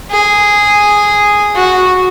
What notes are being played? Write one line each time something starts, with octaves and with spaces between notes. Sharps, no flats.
G#4
F#4